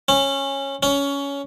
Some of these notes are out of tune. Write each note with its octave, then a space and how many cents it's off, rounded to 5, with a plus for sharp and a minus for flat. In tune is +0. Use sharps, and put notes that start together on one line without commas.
C#4 -15
C#4 +15